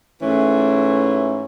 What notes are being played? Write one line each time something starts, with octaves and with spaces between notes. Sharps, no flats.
G#2 E3 A3 C#4